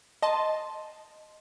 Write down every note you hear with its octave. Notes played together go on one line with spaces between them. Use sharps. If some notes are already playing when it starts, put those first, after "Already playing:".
D#5 A5 C6